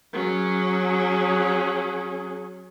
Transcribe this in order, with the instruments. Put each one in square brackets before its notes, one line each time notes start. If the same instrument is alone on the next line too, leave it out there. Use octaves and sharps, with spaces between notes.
[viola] F#3 C#4 [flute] G#4